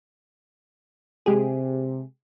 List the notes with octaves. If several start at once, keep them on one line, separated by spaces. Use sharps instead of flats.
C3 G#3 G4 G#4